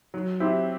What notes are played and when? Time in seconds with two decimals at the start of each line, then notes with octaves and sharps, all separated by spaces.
0.14 F#3
0.40 C4 E4 G4